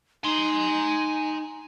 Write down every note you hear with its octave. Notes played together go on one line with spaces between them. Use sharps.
D#4 G#5 C6